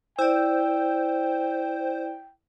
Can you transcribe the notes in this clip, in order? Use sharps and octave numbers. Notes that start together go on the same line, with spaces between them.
E4 C5 D5 G5